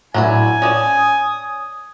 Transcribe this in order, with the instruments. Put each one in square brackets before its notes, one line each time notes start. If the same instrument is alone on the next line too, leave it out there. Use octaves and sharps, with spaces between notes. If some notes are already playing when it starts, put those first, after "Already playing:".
[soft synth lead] A2 [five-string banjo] F#3 D4 E4 [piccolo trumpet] G#5
[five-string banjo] C#4 D5 A5 [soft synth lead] D#6